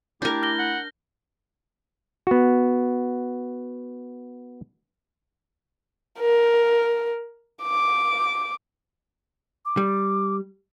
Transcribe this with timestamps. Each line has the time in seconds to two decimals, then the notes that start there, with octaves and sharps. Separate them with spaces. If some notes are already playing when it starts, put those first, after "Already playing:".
0.22 A3 D4 E4 G4 A#4 G6
0.42 F6 A#6 G7
0.59 F#5
2.27 B3 F#4
6.19 A#4
7.63 D6
9.65 D6
9.77 G3